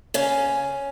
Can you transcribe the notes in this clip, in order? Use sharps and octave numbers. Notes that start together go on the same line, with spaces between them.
C#3 C#4